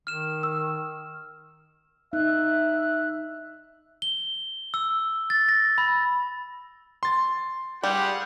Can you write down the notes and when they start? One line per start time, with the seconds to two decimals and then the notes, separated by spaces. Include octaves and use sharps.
0.07 D#3 F6 E7
0.43 E6
2.13 D#4 E5 F#6
4.02 G7
4.74 E6
5.30 A6
5.49 A#6
5.78 B5
7.03 C6 A6
7.83 G3 G4 G#4 F5 F#5